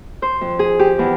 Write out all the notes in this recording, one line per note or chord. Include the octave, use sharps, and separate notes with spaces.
C5
F2
G#4
G4
E2